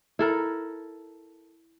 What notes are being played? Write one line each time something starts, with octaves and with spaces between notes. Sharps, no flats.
E4 A4 A#4